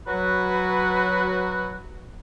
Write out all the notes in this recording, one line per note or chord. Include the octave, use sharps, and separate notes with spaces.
F#3 F#4 B4